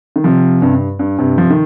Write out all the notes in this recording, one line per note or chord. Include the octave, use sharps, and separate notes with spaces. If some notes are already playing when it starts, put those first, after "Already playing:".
D#3
C3 F3
G2 C3
G2
G2
G2 C3
C3 F3
D#3